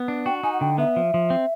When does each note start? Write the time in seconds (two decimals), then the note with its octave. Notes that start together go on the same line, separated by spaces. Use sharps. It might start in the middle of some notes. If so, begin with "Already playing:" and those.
Already playing: B3
0.08 D4
0.26 F#4 G5
0.43 D#4 G#5
0.53 F#5
0.61 D3 G5
0.78 B3 E5
0.96 F3
1.14 F3
1.30 C4